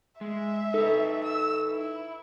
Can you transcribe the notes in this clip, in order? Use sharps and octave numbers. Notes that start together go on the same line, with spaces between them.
G#3 E5
D#4 A4 B4
E6
E4